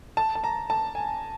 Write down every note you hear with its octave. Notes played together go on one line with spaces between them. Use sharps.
A5
A5
A#5
A5
G#5